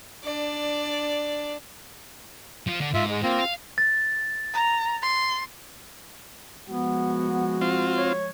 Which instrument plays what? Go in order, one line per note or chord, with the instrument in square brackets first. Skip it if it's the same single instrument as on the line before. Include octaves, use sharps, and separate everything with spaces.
[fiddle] D4 D5
[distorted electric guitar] F3
D3
[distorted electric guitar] G#2 [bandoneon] F4 E5
[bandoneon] G#3
[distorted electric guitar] A#3 [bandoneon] C4 F4
[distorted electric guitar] F5
[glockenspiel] A6
[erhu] A#5
C6
[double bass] F3 G#3 [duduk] B3 [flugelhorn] F#4
[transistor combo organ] C4 F4
[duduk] C#5